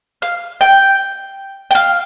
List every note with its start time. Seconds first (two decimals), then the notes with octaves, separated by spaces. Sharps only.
0.22 F5
0.61 G5
1.71 G5
1.75 F5